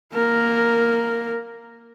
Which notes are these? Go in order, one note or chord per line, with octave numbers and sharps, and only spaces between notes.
A#3 A#4